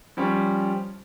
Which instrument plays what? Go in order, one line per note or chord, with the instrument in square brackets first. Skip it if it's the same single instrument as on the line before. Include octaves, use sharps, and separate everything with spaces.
[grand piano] F3 G3 C#4